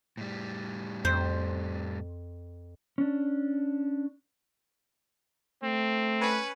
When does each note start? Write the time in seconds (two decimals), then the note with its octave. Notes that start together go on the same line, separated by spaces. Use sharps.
0.17 A2 G3
1.05 F2 C5
2.98 C#4 D4
5.63 A3 C4
6.21 C#4 B4